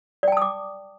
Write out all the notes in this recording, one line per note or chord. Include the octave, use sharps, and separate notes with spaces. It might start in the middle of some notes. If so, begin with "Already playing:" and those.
D5 G5 A5 D6 D#6